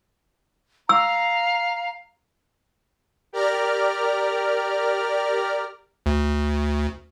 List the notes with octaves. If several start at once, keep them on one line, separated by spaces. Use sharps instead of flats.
F5 A#5 E6
G4 A#4 D5 A#5 F6
D2